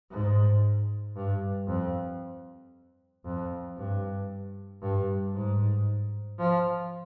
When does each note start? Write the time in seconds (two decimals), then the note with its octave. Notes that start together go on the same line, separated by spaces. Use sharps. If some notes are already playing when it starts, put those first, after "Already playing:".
0.11 G#2
1.16 G2
1.67 F2
3.25 F2
3.77 G2
4.82 G2
5.34 G#2
6.39 F3